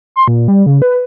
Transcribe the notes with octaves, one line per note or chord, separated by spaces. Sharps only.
C6
A#2
G3
C#3
B4